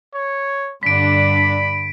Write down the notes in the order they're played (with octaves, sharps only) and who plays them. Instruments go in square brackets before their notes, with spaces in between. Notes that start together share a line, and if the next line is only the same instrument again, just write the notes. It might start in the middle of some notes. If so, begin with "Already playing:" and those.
[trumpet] C#5
[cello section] G2 D3 D4 [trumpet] B5 [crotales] B6 D7